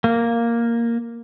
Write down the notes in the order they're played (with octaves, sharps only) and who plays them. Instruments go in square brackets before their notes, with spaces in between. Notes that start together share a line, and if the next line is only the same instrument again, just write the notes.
[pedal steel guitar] A#3